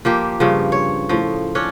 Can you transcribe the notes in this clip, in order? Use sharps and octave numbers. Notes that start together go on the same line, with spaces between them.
F3 A#3 G4
G2 C#3 F3
C#5
A2 F3
C#4 D4 C#5